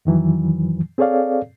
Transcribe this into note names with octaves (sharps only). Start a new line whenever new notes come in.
F2 D#3 E3 F#3
C4 G#4 A4 C#5 D5 F5